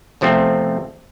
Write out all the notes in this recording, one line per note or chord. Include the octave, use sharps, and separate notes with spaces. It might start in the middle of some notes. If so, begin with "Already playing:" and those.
E2 C3 F3 A3 C4